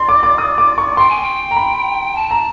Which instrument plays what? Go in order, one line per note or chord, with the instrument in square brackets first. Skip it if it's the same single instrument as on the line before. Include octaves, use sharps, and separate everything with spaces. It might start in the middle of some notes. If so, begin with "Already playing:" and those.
Already playing: [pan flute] D5 [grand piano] C6
[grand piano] D6
D6
D#6
D6
C#6
[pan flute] G5 [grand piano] C6
[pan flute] G#5
G5
[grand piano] A#5
B5
[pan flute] A5
[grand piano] A#5